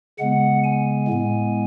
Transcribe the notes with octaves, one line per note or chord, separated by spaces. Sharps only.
C#3 G#3 B3 F#5
G#5
A2 G#3 B3